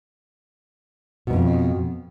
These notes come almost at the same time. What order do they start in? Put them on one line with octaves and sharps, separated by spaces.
B2 G#2 F2